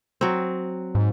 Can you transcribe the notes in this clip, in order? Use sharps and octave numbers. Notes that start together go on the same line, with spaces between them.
F#3 C4
G#2